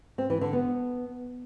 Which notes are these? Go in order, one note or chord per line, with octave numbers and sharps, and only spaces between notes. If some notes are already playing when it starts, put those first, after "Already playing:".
C4
E3
D3
B3